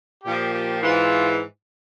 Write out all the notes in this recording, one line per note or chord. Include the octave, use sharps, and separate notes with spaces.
A#2 F3 G4
G4
G#2 E3 F4